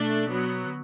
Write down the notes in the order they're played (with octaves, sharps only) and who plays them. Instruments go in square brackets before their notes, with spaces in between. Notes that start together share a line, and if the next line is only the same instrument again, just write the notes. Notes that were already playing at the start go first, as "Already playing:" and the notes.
Already playing: [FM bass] B2 [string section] A3 D4
[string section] F#3 B3
[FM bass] D3